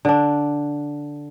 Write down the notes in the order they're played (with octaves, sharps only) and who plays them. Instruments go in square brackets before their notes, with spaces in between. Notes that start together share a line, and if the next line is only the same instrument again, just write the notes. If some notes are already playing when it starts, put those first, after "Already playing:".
[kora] D3 D4